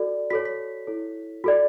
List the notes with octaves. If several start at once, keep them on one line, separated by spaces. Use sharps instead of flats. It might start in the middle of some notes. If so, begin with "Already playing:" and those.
Already playing: F#4 A4 D5
F#4 A4 C#5 B6
B6
E4 A4 C#5
F#4 A4 D5